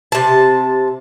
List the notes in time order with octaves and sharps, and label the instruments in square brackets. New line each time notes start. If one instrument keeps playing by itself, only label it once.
[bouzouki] C3 A5